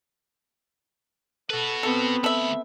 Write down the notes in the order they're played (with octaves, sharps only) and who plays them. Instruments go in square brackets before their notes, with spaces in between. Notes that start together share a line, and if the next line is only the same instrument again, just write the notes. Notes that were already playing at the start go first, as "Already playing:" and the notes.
[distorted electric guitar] F#4 B4 [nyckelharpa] A4
[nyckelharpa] B3 C4 [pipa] A4
[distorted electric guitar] D2 B5 [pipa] A4 E5